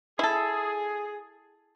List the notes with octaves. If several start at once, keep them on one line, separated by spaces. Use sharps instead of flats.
E4 G#4 A4